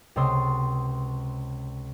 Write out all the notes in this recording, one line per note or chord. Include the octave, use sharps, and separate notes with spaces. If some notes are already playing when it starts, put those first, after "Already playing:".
C#2 C3 A4 C#5 C6 D#6